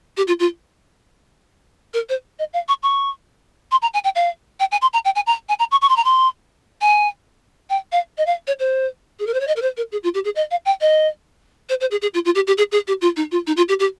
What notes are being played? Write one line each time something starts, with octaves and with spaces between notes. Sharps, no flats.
G4
F4
F4
A#4
C5
D#5
F5
C#6
C#6
C6
A#5
G#5
G5
F5
G5
G#5
C6
A#5
G5
G#5
A#5
G#5
A#5
C#6
C#6
C6
A#5
C6
G#5
G5
F5
D#5
F5
C#5
C5
G#4
A#4
C5
C#5
D#5
A#4
C5
A#4
G#4
F4
G4
G#4
D#5
F5
G5
D#5
C5
C5
G#4
G#4
F4
F4
G4
G4
G#4
G#4
G4
F4
D#4
F4
D#4
F4
G4
G4